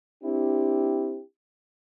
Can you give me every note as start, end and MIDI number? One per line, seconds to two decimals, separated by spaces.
0.24 1.21 60
0.24 1.21 62
0.24 1.21 64
0.24 1.21 67